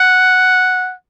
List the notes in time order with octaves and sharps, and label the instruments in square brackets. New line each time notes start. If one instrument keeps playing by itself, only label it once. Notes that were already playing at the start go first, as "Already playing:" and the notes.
Already playing: [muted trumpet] F#5